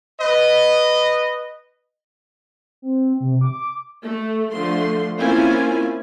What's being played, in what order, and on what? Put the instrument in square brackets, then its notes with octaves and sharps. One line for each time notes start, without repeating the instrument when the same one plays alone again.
[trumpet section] B4 D#5
[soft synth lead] C4
C3
D6
[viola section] A3
D3 F3 A3 C6
A#3 C4 C#4 E4 F4 G#5